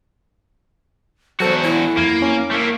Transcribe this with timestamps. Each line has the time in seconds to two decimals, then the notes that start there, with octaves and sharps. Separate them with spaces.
1.40 E2 F#3 F#4 A4 C5
1.64 E4
1.98 F2 A#3 G#6
2.22 C#4
2.51 A3 A#3